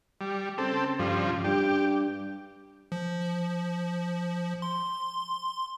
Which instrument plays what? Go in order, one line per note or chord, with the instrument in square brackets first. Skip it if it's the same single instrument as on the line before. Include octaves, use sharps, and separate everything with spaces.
[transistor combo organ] G3
[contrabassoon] C#3 [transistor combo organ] C4 A4
[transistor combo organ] G2 F3
[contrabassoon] G2 [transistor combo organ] G4
[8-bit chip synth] F3
C6